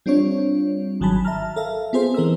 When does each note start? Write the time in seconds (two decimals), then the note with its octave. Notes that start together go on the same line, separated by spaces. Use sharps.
0.06 G3 C4 D4 F4 C#5
1.00 G#1 D#3 F#3 G#5 A5 B5
1.25 E5 A5 A#5 F6
1.56 A4 A#4 E5 F5
1.93 B3 C4 F4 G#4 A4 C5
2.14 E3 A#4 D#5 E6